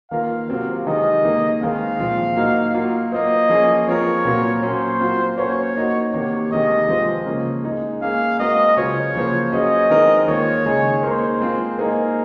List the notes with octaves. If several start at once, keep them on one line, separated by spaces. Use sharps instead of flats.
D#3 A#3 F4 A#4 F5
C3 F#3 C4 F4 C5
C3 D#3 G#3 D#4 D#5
D#3 A#3 D#4
D#3 G#3 C4 F5
A#2 F3 C4 F4
F#3 A#3 D#4
F#3 A#3 F4
A#3 F4 C5 D#5
F3 A#3 C#4 G#4
F3 C4 F4 A#4 C#5
A#2 F#3 C4 F4 A#4
F#3 A#3 C#4 C5
F#3 C4 F4
A#3 C#4 F#4 C5 C#5
A#3 D#4 F#4
C3 D#3 A#3 C#5
C3 D#3 G#3 D#4 D#5
F3 G#3 C4 F4 C5
C#3 F3 A#3 C#4
G#3 D#4 G#4
A#3 C#4 G#4 F5
G#3 C4 F#4 A#4 D#5
C#3 F#3 C#4 F4 C5 C#5
C#3 F3 A#3 F4 C5
F#3 C#4 G#4 C5 D#5
D#3 G#3 C4 D#4 A#4
D#3 A#3 F4 C#5
C#3 G#3 D#4 G#4
A#3 D#4 A#4 C5
G#3 C4 F4
A#3 D#4 G#4 A#4 C5